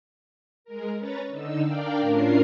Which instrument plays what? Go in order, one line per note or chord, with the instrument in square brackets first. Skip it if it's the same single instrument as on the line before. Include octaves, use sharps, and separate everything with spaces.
[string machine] G#3 A#4
C#4 B4 C#5 A#5 A6
D3 D#4 E6
D4 A#4 D5 F5 G5
A2 C#4 D4 F4 A#4 C7